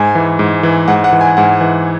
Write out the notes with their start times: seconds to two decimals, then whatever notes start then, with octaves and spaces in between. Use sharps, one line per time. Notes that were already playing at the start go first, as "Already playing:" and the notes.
Already playing: G#2 G#5
0.15 E3
0.39 G#2
0.63 E3
0.88 G#2 F#5
1.04 F#5
1.13 E3
1.21 G#5
1.37 G#2 F#5
1.61 E3